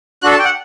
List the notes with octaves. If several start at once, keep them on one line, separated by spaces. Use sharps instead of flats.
D4 F#4 A4 F#6
A5
G5
F#5